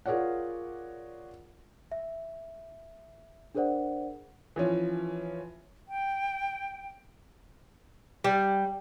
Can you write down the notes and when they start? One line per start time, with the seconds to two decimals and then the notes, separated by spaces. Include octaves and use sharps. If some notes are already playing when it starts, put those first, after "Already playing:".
0.06 F4 G#4 A#4 C#5 D5 F#5
1.92 E5
3.55 D4 G#4 A#4 C5 D5 F#5
4.56 E3 F3 C#4
5.88 G5
8.24 G3